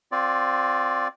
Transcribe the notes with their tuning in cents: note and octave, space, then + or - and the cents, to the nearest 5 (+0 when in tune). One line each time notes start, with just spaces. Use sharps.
C4 +0 F4 +25 D5 -10